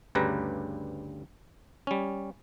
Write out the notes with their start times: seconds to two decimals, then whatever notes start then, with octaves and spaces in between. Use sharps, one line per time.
0.15 D2 G2 C#3 G3 B4 A#5
1.87 G3 C#4